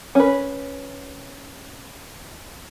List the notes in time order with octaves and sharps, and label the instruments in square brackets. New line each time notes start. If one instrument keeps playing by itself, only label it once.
[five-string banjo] C#4 B4